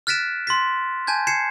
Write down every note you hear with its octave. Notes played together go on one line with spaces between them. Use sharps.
F6 F#6 A6 B6 D7 E7
C6 A6 B6
G#5 A5 G6 G#6
G#6 C7 C#7 E7